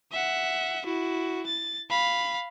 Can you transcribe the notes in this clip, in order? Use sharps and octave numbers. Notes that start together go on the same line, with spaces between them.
E5 F#5
E4 F#4
A6
F5 B5